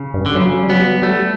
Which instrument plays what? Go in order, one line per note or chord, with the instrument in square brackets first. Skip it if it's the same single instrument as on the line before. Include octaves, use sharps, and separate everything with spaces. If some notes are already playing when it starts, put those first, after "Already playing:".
Already playing: [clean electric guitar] C#3
[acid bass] G2
[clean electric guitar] D3
[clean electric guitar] C#3 [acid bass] F#3
[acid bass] G3
[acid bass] F#3 [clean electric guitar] B3
[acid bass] G3 [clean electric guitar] A3